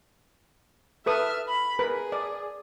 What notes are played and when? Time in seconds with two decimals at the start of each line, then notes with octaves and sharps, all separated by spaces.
1.06 A4 B4 E5 D#6 F6
1.48 B5
1.79 G#4 A#4 B4 B5
2.12 D5